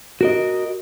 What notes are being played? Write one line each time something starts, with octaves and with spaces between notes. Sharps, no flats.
F#4 A#4 D#5